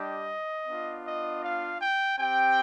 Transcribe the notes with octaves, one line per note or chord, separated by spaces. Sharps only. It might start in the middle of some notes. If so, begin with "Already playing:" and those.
Already playing: G3 D4 G4 D#5
B3 D4 F4
D#5
F5
G5
C4 G4 G5